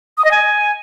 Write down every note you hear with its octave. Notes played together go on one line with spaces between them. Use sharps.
D#6
D#5
G#5